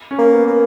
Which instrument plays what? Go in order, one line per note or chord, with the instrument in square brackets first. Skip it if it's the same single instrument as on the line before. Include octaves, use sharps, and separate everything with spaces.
[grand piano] C#4
[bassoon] A#3
[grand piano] B3
[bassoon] A#3